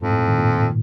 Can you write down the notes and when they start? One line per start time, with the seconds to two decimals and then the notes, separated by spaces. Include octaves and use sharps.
0.01 F2 G#2
0.10 A2
0.19 A#2
0.28 D#3
0.38 A#2